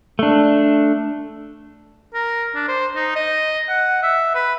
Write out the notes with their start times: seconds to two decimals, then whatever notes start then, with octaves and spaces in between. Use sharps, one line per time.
0.19 A3 D4
2.14 A#4
2.55 D4
2.68 C5
2.96 D#4
3.16 D#5
3.69 F#5
4.03 E5
4.35 B4